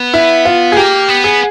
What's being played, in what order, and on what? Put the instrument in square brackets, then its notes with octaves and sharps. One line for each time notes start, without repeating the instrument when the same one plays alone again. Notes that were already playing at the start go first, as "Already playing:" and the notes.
Already playing: [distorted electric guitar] B3
[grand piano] E4
F4
G#4
[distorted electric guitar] A#3 [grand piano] G4
[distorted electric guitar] B3
[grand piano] G#4